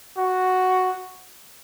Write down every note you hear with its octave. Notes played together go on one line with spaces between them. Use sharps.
F#4